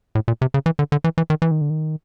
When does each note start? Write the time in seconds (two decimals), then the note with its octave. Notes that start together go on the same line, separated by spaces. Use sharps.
0.15 A2
0.28 A#2
0.42 C3
0.54 C#3
0.66 E3
0.79 D3
0.92 D3
1.04 E3
1.18 E3
1.30 D#3
1.42 E3
1.51 D#3
1.61 D3
1.70 D#3